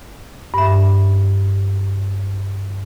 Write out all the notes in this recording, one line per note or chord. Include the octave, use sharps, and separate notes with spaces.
G2 E5